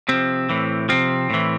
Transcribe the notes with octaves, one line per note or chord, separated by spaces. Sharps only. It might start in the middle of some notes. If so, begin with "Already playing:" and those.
C3 F3 C4
A2 E3
C3 F3 C4
A2 E3